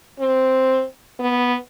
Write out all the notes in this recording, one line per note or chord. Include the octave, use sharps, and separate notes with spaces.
C4
B3